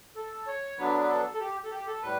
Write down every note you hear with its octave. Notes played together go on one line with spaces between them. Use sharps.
A4
C#5
D3 F#3 B3 D4 B4
B4
A4
A4
G4
A4
G4
A4
A2 G3 B4